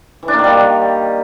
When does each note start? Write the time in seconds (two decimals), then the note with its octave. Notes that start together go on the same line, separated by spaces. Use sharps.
0.23 E3
0.28 D4
0.33 A#3
0.39 D#3
0.44 G3